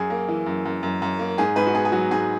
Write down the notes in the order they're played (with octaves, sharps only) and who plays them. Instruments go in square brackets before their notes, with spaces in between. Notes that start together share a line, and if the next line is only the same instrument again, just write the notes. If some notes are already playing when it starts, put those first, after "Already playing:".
Already playing: [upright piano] F#2 G#4
A#3
E3
F#2
F#2
F#2
F#2
A#3
G#2 G#4
G#2 B4
F#4
B3 G#4
G#4
F#3 F#4
G#2 G#4